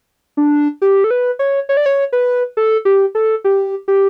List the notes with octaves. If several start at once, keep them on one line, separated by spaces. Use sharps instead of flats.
D4
G4
A4
B4
C#5
C#5
D5
C#5
B4
A4
G4
A4
G4
G4